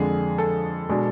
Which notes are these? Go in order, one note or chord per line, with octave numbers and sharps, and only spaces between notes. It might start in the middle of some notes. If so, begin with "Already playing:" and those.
Already playing: F2 D3 G#3 D4 G#4
A4
B2 G#3 D4